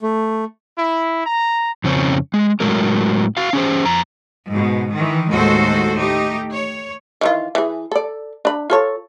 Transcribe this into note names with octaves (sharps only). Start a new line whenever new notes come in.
A3
E4
A#5
F2 C#3 C4 C#4
G#3
A2 F#3 G#3 A#4
F#4 F5
C#4 G#4 C5
F2 A#5
G#2 B2
D#3 E3
D#2 A2 G#3 F#4 A4 C5
A3 D#4 G4
C#5
D#3 E3 F4
E3 G#4
A4 D5
D4 B5
F4 A4 C#5